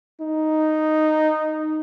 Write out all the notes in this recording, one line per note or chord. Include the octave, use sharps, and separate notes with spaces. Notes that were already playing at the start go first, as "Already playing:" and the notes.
D#4